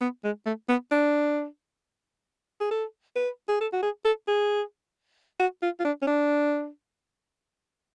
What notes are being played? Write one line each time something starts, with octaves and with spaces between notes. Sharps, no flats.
B3
G#3
A3
B3
D4
G#4
A4
B4
G#4
A4
F#4
G#4
A4
G#4
F#4
F4
F4
D4
C#4
D4